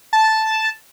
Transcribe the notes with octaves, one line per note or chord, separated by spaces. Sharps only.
A5